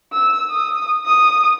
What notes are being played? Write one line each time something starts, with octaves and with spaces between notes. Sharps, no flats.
E6
D#6
D#6